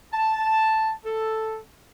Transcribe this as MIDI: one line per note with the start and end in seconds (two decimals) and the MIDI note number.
0.13 0.92 81
1.05 1.58 69